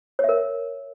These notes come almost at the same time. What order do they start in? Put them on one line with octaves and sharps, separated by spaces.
C#5 E5 A#4